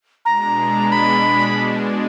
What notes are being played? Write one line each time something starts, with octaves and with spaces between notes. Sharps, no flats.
B2 G#3 D4 A#5
B5